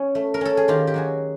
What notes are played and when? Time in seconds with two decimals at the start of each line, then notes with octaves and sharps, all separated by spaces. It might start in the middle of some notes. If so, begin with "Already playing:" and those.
Already playing: C#4
0.15 A3
0.34 A#4
0.41 C#4 A4
0.57 G#4
0.68 D#3 F4 G4
0.87 G4
0.94 F#3 F#4 G#4